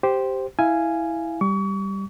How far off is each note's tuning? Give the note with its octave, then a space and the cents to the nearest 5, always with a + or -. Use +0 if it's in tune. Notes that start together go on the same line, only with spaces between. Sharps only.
G4 -5 C5 +0
E4 -10 F5 -15 G#5 +0
G3 +0 C#6 +35